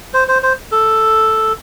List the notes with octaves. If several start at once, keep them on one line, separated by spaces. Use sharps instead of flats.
C5
C5
C5
A4